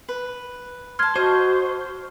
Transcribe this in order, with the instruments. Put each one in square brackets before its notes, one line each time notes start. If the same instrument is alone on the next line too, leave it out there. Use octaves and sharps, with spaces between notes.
[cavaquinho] B4
[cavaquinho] A5 C6 [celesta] F6 G#6
[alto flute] F#4 [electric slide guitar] C5 [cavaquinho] D#5 C#6